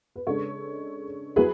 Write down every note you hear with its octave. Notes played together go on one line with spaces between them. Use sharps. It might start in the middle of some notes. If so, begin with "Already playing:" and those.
B4
C#3 G#3 D4 A4 C#5
F#3 E4 G#4 B4